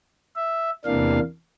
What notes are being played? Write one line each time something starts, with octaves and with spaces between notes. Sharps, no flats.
E5
E2 C3 E3 A#3 D4 F5